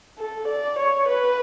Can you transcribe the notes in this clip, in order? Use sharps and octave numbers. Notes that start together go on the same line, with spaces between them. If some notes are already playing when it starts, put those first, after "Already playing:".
A4
D5
C#5
B4